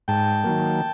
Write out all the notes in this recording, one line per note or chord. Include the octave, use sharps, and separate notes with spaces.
G#2 G5 A5
D#3 F#3 A#3